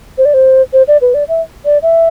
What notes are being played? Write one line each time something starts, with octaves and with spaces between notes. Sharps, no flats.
C5
D5
C5
C5
D5
B4
D5
E5
D5
E5